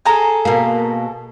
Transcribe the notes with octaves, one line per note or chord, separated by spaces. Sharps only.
G#4 A4 A#5
B2 A#3